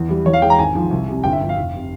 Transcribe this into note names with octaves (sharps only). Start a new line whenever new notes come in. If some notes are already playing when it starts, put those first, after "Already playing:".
Already playing: E2
E3 G3
E2 C#5
F5
E3 G#3 G5
A#5
G#1 G#5
G#2 F3
C2
C3 G3
G1 G5
E5
G2 F3
F5
F1
C3